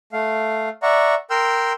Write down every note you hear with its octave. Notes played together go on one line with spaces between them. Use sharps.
A3 F5
D5 E5 F#5 A#5 C#6
A#4 G5 C6 E6 F6 G6